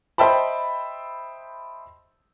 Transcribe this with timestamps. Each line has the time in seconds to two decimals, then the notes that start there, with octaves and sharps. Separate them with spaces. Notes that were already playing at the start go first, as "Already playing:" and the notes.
0.18 C5 D#5 E5 G5 A5 B5